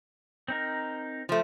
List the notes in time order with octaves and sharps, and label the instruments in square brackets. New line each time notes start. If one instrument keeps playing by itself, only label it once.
[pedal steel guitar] C4 D#4 A#4
[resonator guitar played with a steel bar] F3 A3